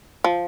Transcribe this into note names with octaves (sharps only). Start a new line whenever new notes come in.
F3